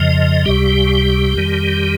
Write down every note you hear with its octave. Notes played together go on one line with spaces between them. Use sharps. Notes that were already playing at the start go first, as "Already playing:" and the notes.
Already playing: F2 C#3 F3 D#5
C#2 C3 G3 G4
F2 D#3 G3